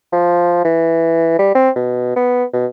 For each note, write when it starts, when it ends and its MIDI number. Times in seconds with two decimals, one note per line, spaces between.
0.13 0.64 53
0.65 1.34 52
1.39 1.54 55
1.55 1.70 60
1.76 2.13 47
2.16 2.44 59
2.54 2.66 47